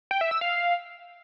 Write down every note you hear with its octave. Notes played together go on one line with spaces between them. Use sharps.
G5
E5
E6
F5